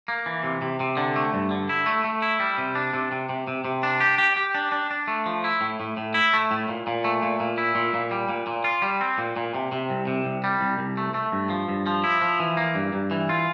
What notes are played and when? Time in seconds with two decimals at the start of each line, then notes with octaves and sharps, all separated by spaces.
0.08 A#3
0.26 E3
0.44 C3
0.62 C3
0.80 C3
0.97 D3
1.16 A3
1.34 G2
1.51 D3
1.69 E4
1.86 A3
2.04 A3
2.22 E4
2.40 G3
2.58 C3
2.75 D4
2.94 C3
3.12 C3
3.29 C3
3.48 C3
3.65 C3
3.83 D4
4.00 G4
4.18 G4
4.36 G4
4.55 D4
4.72 D4
4.91 D4
5.08 A3
5.26 F3
5.44 E4
5.61 A2
5.80 A2
5.97 A2
6.14 E4
6.33 A3
6.51 A2
6.69 A#2
6.87 A#2
7.04 A3
7.23 A#2
7.40 A#2
7.58 E4
7.75 A#2
7.94 A#2
8.11 G3
8.29 A#2
8.47 A#2
8.64 F4
8.82 G3
9.01 C4
9.18 A#2
9.36 A#2
9.55 C3
9.72 C3
9.90 C2
10.07 C3
10.25 C2
10.44 G3
10.61 C2
10.79 C2
10.97 A3
11.14 A3
11.32 G2
11.50 F3
11.69 G2
11.87 F3
12.04 E4
12.22 F3
12.40 E3
12.57 A#3
12.75 G2
12.93 G2
13.11 E3
13.29 F4